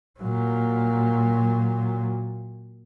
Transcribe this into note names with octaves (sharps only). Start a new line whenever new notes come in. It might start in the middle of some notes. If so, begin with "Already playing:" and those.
A#2 F#3